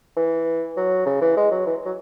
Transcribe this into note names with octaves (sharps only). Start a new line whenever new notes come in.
E3
F#3
C#3
E3
G#3
F#3
E3
F#3